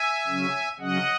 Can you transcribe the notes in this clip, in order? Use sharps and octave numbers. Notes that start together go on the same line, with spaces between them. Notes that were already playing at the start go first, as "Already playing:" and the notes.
Already playing: E5 G#5
C#3 F#3 C#4
C#3 F#3 C#4 D#5 F#5